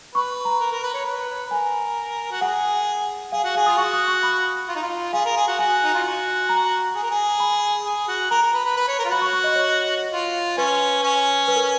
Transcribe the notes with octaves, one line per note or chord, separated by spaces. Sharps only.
B4 C#6
A#5
A#4
A#4
B4
C#5
B4
A#4 G#5
F#4
G#4 F#5
G#4 F5
F#4
G#4 F5
F4 D#6
F#4 C#6
D#6
C#6
B5
F4
D#4
F4
G#4 F5
A#4
G#4
F#4
F#4 G#5
D#4
F4
F#4
A#5
G#4
A#4
G#4
B5
G#4
F#4
A#4 A#5
A#4
B4
B4
B4
C#5
A#4
F4
F#4 B5
C#6
C#6
D#5
C#5
F4
C#4 B4
C#4
B4
A#4